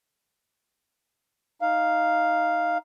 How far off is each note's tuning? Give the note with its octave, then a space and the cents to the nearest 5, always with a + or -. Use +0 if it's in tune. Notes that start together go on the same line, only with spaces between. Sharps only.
D#4 +0 F5 +0